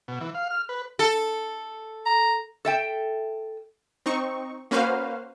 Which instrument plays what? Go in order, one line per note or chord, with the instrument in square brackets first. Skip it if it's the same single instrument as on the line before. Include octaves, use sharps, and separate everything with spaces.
[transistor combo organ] B2
E3
F5
F6
B4
[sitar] A4
[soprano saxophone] A#5
[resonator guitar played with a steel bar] A4 E5 G5
[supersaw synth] C4 D#4 C#6
A#3 C#4 F#4 B4 C5 F5